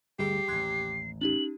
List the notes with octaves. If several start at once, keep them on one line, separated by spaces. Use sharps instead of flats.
G1 D2 G#2 G3 G4 G#4 C7
A1 D#2 C6 F#6 G#6
C#4 D#4 G4 F#7